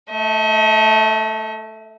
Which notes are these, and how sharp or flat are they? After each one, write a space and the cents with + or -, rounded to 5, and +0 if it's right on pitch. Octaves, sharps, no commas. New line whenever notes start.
A3 +0 D#5 +45